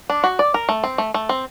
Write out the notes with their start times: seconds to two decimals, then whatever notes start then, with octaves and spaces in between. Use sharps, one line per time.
0.10 D4
0.24 F#4
0.39 D5
0.54 A#4
0.69 A3
0.84 C4
0.98 A3
1.14 A3
1.29 C4